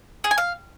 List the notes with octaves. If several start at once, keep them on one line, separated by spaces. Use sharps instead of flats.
G#4
G#5
F5